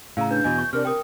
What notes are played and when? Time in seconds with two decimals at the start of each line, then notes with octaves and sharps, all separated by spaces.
0.17 A2 C#3 F5 A#5 E6
0.31 D4 B4 G6
0.44 E2 B2 D#5 G#5
0.58 C#6
0.73 C3 D4 A#4 F6
0.85 A#4 G5 D#6